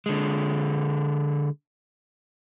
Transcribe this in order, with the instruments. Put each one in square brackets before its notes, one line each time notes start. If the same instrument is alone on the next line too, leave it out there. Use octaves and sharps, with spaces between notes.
[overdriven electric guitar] D3 G#3